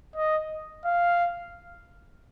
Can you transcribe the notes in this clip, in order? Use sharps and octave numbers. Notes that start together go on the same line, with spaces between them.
D#5
F5